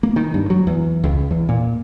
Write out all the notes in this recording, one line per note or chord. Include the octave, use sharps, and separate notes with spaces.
A#3
D#3
G2
F#3
E2
C#2
E2
A#2